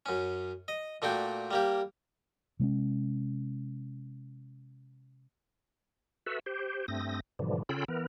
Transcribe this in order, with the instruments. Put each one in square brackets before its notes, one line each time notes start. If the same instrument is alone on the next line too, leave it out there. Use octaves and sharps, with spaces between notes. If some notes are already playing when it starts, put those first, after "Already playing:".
[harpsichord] F#2 C#4
D#5
A#2 A3 D4 F#4 G5
G3 A#3 G4
[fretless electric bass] C3 G#3 A#3 C#4
[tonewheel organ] F#4 A4 B4 E5
G4 C5
G2 A3 C4 D#6 A#6
G#2 B2 D3 E3 F3 G3
C#3 C#4 F4 A4 G5 B5
E3 B3 A#4